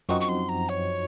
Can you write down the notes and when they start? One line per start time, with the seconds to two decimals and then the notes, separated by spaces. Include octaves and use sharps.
0.09 F#2 F3 C4 D#4 F#4 C#6
0.21 C#6
0.29 C6
0.49 A#5
0.69 C#5